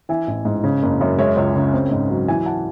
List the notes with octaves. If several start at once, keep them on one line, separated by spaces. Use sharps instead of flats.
E3 E5 G#5
A1
G#2
C#3
F#1
F#2
G#3 C#5 E5
C#2
C#3
C4
G#2
F#3
E3 E5 G#5
F#5 A5